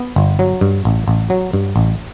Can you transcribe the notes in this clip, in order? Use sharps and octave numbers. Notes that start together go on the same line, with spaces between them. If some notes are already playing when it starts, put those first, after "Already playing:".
Already playing: B3
G1
F#3
G2
A1
A1
F#3
G2
A1